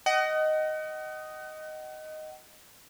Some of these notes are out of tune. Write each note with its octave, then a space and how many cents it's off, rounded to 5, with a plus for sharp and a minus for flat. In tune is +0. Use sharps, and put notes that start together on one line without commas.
D#5 +0 F#5 +40